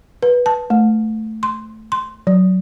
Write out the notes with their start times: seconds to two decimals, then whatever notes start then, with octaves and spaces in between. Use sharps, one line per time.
0.23 B4
0.46 A5
0.70 A3
1.43 C6
1.92 C6
2.27 F#3